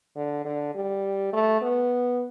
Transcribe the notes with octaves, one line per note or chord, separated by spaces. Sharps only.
D3
D3
G3
A3
B3